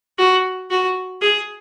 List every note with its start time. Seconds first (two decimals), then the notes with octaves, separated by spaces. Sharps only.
0.18 F#4
0.70 F#4
1.22 G#4